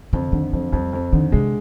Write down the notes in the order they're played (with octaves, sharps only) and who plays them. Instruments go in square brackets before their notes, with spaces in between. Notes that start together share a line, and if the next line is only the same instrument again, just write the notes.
[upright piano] F2 [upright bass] D3
[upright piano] D3 [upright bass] D#3
[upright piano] F2 [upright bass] F3
[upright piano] F2 [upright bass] G3
[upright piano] F2
[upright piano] D3 [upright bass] D#3
[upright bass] C3 [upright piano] G#3